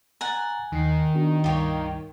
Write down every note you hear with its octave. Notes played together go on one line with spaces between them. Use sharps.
F#5 G#5 A#5 A6
D#2 D#3 C7
B3 D4 F#4
C#2 G2 G3 F4 G4 C#5